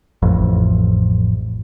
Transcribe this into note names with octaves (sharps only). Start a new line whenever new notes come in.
A1 F2